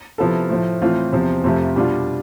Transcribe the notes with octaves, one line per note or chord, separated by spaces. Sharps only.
C3 F3 B3 E4 A4
A2 F3 A3
A2 E3 A3 C4 F4
E2 C3 F3 C4
F2 C3 F3 A3
B2 G3 D4 F4